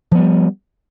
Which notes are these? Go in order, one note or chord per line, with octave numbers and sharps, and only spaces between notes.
F3 G3 B3